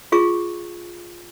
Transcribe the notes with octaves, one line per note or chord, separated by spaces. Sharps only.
F4 G#4 C#6